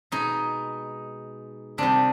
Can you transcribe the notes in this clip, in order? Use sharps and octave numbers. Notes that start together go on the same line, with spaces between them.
B2 G#3 D#4
C3 D#3 G3 D4